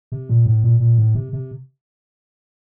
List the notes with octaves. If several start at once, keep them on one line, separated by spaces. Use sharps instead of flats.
C3
A#2
A2
A#2
A#2
A2
C3
C3